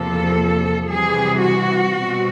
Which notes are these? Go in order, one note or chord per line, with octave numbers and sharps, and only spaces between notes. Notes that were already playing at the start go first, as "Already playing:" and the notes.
Already playing: E2 C3 F3 A#3 A4
C3 E3 G3 G#4
F#4
B2 G3 C4